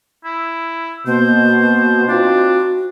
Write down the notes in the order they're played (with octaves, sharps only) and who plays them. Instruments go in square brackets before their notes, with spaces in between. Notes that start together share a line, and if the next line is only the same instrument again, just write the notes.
[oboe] E4
[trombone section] B2 [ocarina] A#3 [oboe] C5
[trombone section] C4 D#4 F4 [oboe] D4 [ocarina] F#4